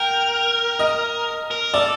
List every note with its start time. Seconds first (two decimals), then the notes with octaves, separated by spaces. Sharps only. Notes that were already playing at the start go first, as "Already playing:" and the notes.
Already playing: A#4 G5
0.79 D#5
1.51 A#4
1.73 A4 D5